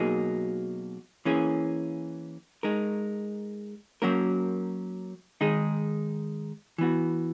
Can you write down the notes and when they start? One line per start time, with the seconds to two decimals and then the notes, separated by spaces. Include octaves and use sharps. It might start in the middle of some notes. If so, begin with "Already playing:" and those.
Already playing: B2 F#3 A#3 D#4 G#4
1.25 E3 A#3 C#4 G#4
2.63 G#3 D#4 A#4
4.02 F#3 A#3 C#4 F#4 A#4
5.41 D#3 G#3 D#4 G#4
6.78 E3 B3 F#4